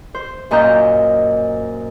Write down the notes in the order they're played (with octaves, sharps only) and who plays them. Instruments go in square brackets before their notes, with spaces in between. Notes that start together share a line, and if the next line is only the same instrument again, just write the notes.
[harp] C5
F#2 A#2 D#5 A#5 G6